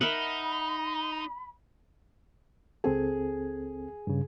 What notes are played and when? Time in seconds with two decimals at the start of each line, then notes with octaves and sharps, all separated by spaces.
0.01 D#4 A#4 E5 F#5 B5
2.84 C#2 C4 G#4 A4
4.07 G2 C#3